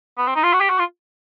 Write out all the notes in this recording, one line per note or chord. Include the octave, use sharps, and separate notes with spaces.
B3
C4
D#4
F4
F#4
G4
F#4
F4